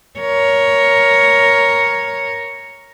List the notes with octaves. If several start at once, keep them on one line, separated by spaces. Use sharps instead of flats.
A#4 C#5